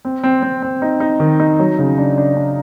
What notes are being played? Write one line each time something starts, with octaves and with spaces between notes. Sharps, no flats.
C4
C4
C4
C4
D#4
D#4
D#3
D#4
F#3
C#3
D4
D4
D4